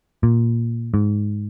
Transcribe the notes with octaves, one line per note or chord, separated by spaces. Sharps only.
A#2
G#2